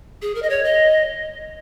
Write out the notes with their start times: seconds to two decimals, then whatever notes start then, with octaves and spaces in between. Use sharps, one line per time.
0.22 G#4
0.35 A#4
0.42 D#5
0.50 C#5
0.64 D#5